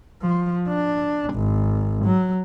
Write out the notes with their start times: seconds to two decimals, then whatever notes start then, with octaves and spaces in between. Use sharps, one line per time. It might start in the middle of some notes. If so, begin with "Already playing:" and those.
0.22 F3
0.69 D4
1.34 G#1
2.05 F#3